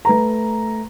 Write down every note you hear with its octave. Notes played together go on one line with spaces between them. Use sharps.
A3 B4 A#5